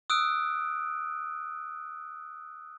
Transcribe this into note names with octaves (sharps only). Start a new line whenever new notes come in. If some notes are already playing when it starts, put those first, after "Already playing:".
D#6 E6 F#6 D7